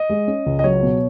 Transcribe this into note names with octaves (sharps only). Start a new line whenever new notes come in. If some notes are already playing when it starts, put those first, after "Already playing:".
Already playing: D#5
G#3
C#4
C#2
D#5
F#3 C#5
B2